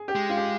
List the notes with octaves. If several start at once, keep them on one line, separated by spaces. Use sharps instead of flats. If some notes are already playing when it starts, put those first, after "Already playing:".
Already playing: G#4
G4
G#3
F4
G4